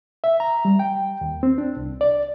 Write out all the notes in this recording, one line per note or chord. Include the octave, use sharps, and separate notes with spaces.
E5
A#5
G3
G5
D#2
C4
D4
C2
D5